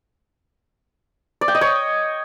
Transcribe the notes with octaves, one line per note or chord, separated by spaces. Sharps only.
D5
G5
D#5
C#5